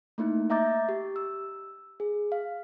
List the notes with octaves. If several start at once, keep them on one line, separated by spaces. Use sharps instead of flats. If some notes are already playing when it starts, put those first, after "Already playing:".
A3 A#3 D#4 E4
D#5 E5 A#5 D6 G6 A6
G4
E6
G#4
F5